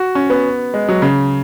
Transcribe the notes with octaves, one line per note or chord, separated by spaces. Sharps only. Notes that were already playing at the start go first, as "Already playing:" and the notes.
Already playing: F#4
C#4
B3
G#3
F#3
C#3